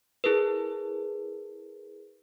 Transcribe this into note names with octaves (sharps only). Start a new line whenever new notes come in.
E4 G#4 A#4 B4